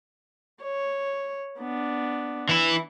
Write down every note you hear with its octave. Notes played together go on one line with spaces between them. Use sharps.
C#5
B3 D4
E3 E4